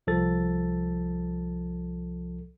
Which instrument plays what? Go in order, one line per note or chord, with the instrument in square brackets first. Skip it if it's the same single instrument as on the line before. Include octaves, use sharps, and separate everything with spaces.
[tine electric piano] C2 F3 A4 A6